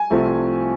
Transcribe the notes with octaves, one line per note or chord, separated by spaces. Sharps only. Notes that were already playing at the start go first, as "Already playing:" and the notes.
Already playing: G#5
C2 C3 F3 A3 C4